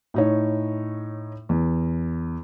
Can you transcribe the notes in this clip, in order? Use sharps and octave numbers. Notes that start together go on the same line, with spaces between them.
A2 D#4 C#5
E2